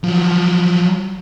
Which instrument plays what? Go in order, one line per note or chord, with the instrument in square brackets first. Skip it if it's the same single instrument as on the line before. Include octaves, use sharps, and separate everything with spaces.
[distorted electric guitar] F3 F#3